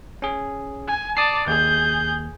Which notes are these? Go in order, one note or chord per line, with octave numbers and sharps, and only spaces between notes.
C#4 G#4
G#5
D5 A5 D#6 C7
D#2 G#4 G6